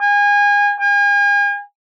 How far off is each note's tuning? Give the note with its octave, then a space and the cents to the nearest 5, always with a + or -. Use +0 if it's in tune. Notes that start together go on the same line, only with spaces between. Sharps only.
G#5 -30
G#5 -40